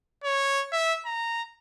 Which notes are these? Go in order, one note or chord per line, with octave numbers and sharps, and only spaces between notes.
C#5
E5
A#5